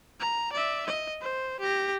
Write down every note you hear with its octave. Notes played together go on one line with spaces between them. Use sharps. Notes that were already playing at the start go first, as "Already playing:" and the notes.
A#5
D5 E5
D#5
C5
G4 A#6